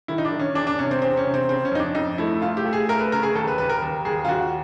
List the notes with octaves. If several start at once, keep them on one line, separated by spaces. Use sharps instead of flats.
D#3 E4
D#4
D4
D#3
C#4
E2 D4
D4
C3 C#4
C4
E2 C4
C#4
C3
C4
C#3 C4
C#4
F2 D#4
D4
F2 D#4
A3 E4
A3 F4
G4
A3
G#4
A3 A#4
B4
C#3 A#4
G#4
D#2 A4
B4
D#2 B4
A#4
D#2
D#2 G#4
F4
D#2 F#4